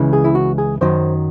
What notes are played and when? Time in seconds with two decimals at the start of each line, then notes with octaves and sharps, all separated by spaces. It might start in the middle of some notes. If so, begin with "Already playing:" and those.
Already playing: C#2 C#3 E3
0.13 G#4
0.24 E4
0.35 F#4
0.58 G#4
0.81 F#2 D#3 F#3 C5